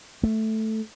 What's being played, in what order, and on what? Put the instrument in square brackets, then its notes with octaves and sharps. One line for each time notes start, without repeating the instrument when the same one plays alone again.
[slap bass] A3